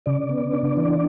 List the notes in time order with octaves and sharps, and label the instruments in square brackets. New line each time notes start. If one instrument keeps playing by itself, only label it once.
[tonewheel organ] C#3 D5
B3
D4
E3